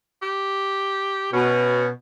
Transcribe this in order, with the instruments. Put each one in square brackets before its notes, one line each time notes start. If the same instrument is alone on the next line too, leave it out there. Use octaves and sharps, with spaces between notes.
[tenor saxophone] G4
[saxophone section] B2 [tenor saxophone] C#4